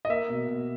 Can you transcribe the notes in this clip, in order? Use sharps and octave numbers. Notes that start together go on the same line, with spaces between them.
D#5
A#3 E5
B2
B2